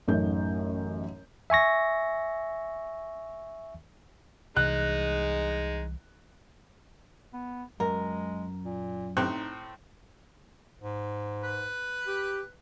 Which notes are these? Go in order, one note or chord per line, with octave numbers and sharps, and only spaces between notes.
A1 F#2 A3 D#4 G6
E5 G#5 C#6 A#6
C2 E3 G#3 D#4 F#6
B3
F#2 G#3 A#4
A#2
A2 C4 D#4 F#6
G#2
B4
G4